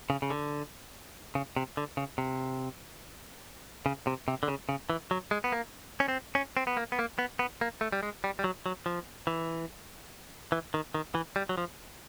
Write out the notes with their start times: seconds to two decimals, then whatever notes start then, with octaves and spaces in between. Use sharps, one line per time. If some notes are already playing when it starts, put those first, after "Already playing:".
0.10 C#3
0.22 C#3
0.30 D3
1.35 C#3
1.56 C3
1.77 D3
1.97 C#3
2.18 C3
3.86 C#3
4.07 C3
4.28 C3
4.43 D3
4.48 C#3
4.69 C#3
4.90 E3
5.11 F#3
5.31 G#3
5.44 B3
5.52 A#3
6.00 C#4
6.08 C4
6.35 C#4
6.57 C4
6.67 B3
6.77 A#3
6.92 B3
6.99 A#3
7.19 B3
7.39 B3
7.61 A#3
7.81 A3
7.92 G3
8.03 G#3
8.24 G3
8.39 G3
8.44 F#3
8.66 F#3
8.86 F3
9.27 E3
10.52 E3
10.74 D#3
10.94 D#3
11.15 E3
11.36 G3
11.49 F#3
11.58 F3